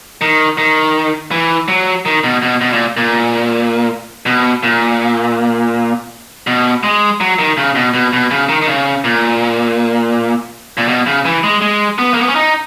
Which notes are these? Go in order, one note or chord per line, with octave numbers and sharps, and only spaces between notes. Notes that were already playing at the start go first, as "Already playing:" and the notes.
D#3
D#3
E3
F#3
D#3
B2
B2
B2
A#2
A#2
B2
A#2
B2
G#3
F#3
D#3
C#3
B2
B2
B2
C#3
D#3
D#3
C#3
A#2
A#2
B2
C#3
E3
G#3
G#3
B3
A#3
B3
C#4
D#4